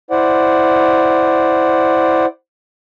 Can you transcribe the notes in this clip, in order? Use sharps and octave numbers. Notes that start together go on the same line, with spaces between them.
E4 C5 D5 F#5